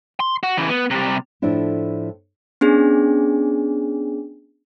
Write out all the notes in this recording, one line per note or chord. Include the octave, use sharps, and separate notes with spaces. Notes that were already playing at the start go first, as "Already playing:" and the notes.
C6
F#4
C#3 E3
B3
C3 G3
A2 F3 A3 D4 E4
B3 C#4 D4 G#4